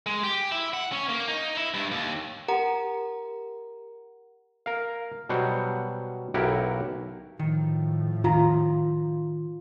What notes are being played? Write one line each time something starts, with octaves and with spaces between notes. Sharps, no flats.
G#3
G4
E4
F#5
C#4
A#3
D#4
E4
G2
D#2
G4 A#4 F#5 A#5
A#4 F5
B2 F#3 G3 C5 F#5
B1 F#3 E4 G4 A#4 F#5
A2 D#3 F3
D#3 F4 A#5